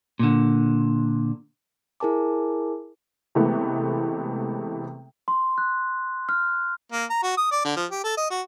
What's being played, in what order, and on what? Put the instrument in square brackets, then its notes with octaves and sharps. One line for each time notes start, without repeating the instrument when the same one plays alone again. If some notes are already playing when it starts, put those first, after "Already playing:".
[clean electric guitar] A#2 D3
[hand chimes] E4 G#4 A#4 G#5 A5 D6
[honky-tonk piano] C3 E3 G#3 A3 B3
[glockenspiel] C6
F#6
F6
[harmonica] A#3
A#5
F#4
D#6
D5
D3
F3
G4
A4
D#5
F#4